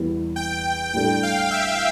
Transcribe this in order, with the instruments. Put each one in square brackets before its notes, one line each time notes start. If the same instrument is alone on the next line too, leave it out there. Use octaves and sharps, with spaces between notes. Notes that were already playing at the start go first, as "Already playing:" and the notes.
Already playing: [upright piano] E2 E3 G3
[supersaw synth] G5
[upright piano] A2 G3 D4 A4 [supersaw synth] G5
[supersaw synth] F5
E5